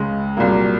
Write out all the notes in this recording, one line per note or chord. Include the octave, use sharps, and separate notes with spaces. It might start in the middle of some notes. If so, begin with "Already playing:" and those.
Already playing: C#2 C#3 G#3
C2 A#2 F#3 A#3